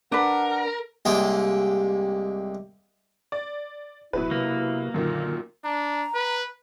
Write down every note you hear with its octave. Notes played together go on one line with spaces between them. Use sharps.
D4 A#4 B4 F#5
C2 G#3 A#3 G4 G5
D5
D1 B2 F#3 E4 B4
C3 A#3
F#2 A#2 D3 D#3 A#4
D4 A#5
B4